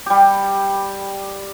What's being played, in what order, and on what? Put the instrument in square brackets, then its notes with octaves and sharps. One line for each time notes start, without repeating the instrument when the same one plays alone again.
[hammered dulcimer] G3 G4